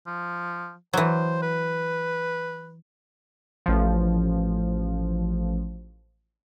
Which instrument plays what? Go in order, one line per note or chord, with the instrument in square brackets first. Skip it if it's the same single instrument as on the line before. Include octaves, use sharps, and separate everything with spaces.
[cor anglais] F3
[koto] E3 F#3 [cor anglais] C5
[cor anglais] B4
[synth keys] A1 F3